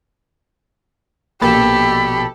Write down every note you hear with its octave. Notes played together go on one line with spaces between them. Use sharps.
A#1 B2 A#3 G4 A4 B5